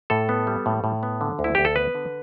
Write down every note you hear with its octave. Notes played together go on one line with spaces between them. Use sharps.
A2 A4
B3
G3
A2
A2
B3
D3
D2
E4
D2 G4
A4
B3 B4
D3